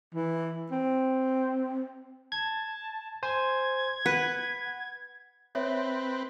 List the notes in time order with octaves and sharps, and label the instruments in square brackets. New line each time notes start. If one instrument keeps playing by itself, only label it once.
[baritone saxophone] E3
C4
[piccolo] A5 [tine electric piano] G#6
[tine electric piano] C5 G#5 [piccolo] G#6
[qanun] B4 [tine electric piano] F#5
[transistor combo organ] C4 B4 [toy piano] C#5 E5